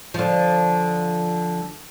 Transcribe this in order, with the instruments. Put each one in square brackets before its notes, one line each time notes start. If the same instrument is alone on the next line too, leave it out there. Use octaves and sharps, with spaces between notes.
[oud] D3 F3